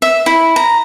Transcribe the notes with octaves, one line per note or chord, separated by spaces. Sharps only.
E5
E4
A#5